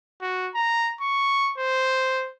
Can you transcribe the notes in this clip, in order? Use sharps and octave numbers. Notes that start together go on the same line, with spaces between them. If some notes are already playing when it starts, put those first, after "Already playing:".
F#4
A#5
C#6
C5